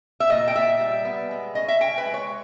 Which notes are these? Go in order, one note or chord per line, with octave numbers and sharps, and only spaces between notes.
E5
A#2 D#5
G5
A#2 E5
G3
B3
G#3
C#4 D#5
E5
C#4 G5
B4
G#3
C#5